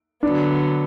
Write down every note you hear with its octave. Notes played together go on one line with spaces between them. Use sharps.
D3 F#3 B3 D4